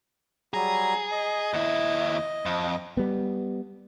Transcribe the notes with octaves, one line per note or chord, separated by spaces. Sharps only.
F#3 G3 G#4 A#5
D#5
D#2 E4
F2
G3 B3